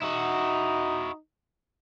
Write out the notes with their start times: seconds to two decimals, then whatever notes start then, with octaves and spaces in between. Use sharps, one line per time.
0.02 D#4 E4 F#4